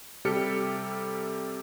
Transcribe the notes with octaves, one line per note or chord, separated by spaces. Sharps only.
C3 G3 G4 A4 F6 C#7